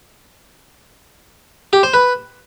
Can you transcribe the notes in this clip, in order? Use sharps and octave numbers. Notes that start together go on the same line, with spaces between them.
G4
C5
B4